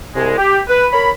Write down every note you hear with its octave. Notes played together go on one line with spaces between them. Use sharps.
C2 G#3
G4
B4
A#4 C#5 B5